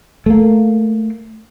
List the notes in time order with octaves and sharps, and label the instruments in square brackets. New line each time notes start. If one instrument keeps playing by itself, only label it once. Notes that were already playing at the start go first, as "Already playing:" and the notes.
[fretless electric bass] A3 A#3